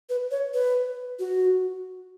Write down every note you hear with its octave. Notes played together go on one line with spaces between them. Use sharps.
B4
C#5
B4
F#4